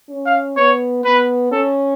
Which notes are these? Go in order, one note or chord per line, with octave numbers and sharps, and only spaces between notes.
C#4
F5
B3 C#5
B3 B4
C#4 A4